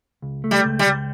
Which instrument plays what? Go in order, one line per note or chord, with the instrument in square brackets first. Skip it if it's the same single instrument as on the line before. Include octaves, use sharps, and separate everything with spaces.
[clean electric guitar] C#2
A3
[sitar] G3
[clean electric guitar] C#2
[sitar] G3
[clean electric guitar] C#2